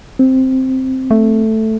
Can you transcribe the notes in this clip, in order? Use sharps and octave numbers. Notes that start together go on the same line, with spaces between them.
C4
A3